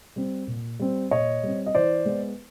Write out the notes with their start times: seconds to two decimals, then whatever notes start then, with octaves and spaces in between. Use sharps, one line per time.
0.16 G3 C4
0.47 A#2
0.79 G3 C4
1.11 A#2 C#5 D#5
1.43 G3 C4
1.66 D#5
1.75 E3 C5 D5
2.05 G#3 B3